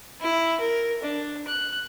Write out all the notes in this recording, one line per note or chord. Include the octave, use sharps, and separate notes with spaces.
E4
A#4
D4
F#6